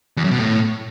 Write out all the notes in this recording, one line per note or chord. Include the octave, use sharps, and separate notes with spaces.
E2
F#2
B2
A2